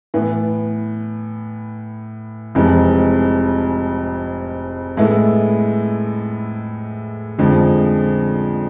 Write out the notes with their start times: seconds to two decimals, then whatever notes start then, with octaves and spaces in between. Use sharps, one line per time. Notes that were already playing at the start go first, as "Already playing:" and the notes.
0.14 A2 E3 B3
2.55 F1 F2 E3 G#3
4.97 A2 G#3 B3 E4 A4
7.38 F2 D3 F3 G#3